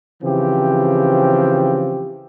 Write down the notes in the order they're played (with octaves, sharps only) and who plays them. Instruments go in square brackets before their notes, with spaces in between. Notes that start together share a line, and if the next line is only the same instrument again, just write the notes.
[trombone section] C#3 E3 F3 C4 G4